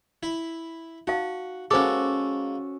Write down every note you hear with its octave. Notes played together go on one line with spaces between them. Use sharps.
E4
D#4 F#4 F5
G#3 A#3 C#4 F#4 A4 C5 D6